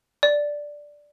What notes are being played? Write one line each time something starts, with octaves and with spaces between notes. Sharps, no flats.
D5